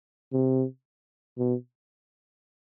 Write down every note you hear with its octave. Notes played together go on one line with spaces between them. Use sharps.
C3
B2